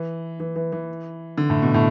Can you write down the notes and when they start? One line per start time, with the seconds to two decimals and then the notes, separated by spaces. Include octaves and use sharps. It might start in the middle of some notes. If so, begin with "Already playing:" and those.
Already playing: E3
0.40 E3
0.56 E3
0.72 E3
1.38 D3
1.50 A2
1.62 B2
1.74 A2